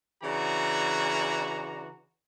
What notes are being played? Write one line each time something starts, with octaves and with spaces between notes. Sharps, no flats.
C#3 E3 D4 F#4 A#5